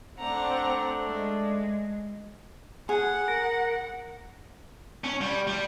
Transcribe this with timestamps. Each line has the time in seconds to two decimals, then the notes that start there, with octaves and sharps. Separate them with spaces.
0.19 A3 C4 D4 F#5 A#5
1.04 G#3
2.89 G#4 F#5
3.28 A#4
5.04 C#4
5.21 G3
5.47 G3